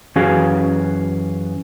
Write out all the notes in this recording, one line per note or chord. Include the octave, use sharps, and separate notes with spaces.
F#2 E3 C#4 F#4 G#4 F5